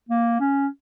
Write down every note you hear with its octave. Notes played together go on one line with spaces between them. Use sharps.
A#3
C#4